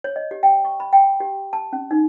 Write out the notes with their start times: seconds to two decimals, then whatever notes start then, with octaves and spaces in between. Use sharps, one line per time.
0.04 C#5
0.16 D#5
0.31 G4
0.43 G5
0.65 C#6
0.80 B5
0.93 G5
1.20 G4
1.53 A5
1.73 C#4
1.91 D#4